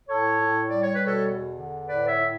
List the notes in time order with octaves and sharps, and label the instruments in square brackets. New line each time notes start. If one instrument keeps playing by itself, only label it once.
[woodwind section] A2 A4 C#5
A2
G3 D5
C#5
B2 B4
A4 C#5
E2
D3
A2 B4 D5
C#5 E5
A2